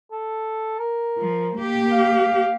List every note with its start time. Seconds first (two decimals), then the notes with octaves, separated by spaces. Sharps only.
0.12 A4
0.79 A#4
1.18 F3
1.57 A#3 G4
1.91 F5